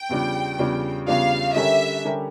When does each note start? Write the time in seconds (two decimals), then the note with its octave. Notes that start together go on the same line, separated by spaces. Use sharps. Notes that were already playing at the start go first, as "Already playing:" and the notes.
Already playing: G5
0.09 E2 C#3 G3 D4 F4
0.58 E2 C#3 G3 D4 F4
1.07 E2 C#3 G3 D4 F4 F5
1.56 D3 G3 C#4 G4 A#4 E5
2.05 D3 G3 C#4 G4 A#4